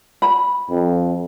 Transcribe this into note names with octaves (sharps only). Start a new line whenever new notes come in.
B5
F2